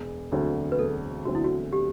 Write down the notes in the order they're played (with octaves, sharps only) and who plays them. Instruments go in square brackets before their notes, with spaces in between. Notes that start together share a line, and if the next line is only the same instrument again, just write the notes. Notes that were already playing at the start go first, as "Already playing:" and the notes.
Already playing: [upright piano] E1
D2 D3 F#3 C4
[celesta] B4
[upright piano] E1 [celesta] A4
[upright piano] D2 D3 F#3 C4 [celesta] F#4
[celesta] E4
F#4
G4